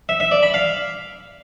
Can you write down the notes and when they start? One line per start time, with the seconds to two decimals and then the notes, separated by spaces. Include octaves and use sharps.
0.09 E5
0.20 E5
0.31 D5
0.43 B5
0.54 F5